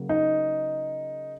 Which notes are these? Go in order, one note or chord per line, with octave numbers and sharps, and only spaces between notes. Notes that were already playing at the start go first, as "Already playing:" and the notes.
Already playing: C#3 F#3 A#3
D#4